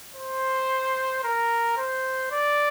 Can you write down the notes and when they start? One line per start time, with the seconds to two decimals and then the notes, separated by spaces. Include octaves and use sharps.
0.16 C5
1.24 A#4
1.78 C5
2.32 D5